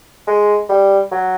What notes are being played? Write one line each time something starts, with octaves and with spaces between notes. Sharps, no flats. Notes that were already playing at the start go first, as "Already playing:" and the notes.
G#3
G3
F#3